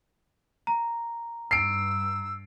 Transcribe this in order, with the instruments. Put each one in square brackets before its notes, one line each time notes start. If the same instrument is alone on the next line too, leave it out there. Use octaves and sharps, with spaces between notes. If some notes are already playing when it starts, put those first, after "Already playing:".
[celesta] A#5
[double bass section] G2 [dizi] E6 [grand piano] C7 D7